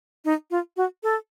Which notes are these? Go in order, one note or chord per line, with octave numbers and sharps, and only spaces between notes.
D#4
F4
F#4
A4